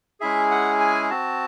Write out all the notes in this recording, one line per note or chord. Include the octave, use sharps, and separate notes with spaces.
G#3 C#4 E4 G#4 E5
F#5
G#5
C4 F#4 A5